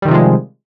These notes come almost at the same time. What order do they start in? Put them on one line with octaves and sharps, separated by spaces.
G3 D#3 C3 F3 G#3